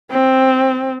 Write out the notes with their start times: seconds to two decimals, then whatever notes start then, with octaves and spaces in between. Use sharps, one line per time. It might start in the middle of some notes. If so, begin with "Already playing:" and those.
0.11 C4